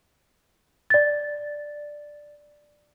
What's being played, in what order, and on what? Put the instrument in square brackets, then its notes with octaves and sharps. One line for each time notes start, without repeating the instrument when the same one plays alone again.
[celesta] D5 A6